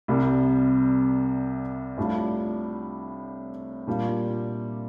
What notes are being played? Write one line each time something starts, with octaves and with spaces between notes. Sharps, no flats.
C2 C3 G3
A2 G3 D4 F4
A#2 G3 D4 F4